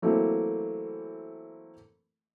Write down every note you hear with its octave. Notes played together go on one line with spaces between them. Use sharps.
E3 F#3 A3 A#3 C4